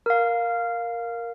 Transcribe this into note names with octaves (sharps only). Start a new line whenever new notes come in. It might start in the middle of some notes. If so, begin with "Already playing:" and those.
A#4 F5